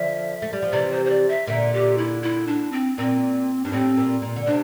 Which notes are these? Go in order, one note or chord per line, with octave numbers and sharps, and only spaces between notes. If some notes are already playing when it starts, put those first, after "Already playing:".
Already playing: D3 F3 E5
A3
G3
F3
C3 E3 D5
C5
C5
D5
E5
A#2 D3 E5
G4
E4
E4
D4
C4
A#2 C4
G2 D4
A2 C4
A#2
A#2
D3
C3 D4